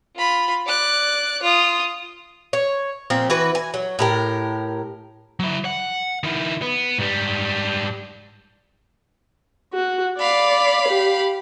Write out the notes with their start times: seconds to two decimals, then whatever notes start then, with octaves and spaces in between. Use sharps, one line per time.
0.16 F4 B5
0.67 D5 F#6
1.42 F4 D#6
2.53 C#5
3.10 A#2 F3 C4
3.30 E3 F#4 B4
3.55 G#5
3.74 F#3
3.99 A2 G4 A#4
5.40 F#3 E4
5.65 F#5
6.23 D#3 E4
6.62 B3
6.99 G#2 G3
9.74 F#4
10.19 D5 F5 B5
10.88 G4